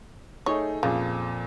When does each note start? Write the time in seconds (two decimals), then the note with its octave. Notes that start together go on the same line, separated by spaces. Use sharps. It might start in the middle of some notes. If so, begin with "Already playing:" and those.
0.46 A3 D#4 G#4 C#5
0.83 F2 A#2 C#3